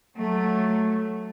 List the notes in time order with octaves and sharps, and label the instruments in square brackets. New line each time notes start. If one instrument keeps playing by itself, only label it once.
[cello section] F#3 A3